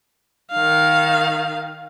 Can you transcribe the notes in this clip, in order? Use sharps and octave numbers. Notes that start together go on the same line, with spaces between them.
D#3 F5